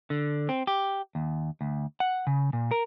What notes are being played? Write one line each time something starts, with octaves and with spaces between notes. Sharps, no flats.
D3
C4
G4
D#2
D2
F#5
C#3
A#2
A#4